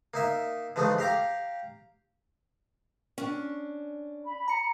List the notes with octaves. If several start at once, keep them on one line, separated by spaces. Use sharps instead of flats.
A#3 D#4 E5
E3 F3 G#3 A3 D#4
G4 F5 A#5 D6
C#4 D4
B5
A#5 C#7